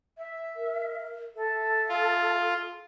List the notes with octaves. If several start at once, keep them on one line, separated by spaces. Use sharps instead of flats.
E5
A#4
A4 E5
F4